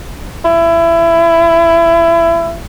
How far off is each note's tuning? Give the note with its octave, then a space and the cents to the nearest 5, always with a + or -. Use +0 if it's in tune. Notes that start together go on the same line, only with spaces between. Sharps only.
E4 +25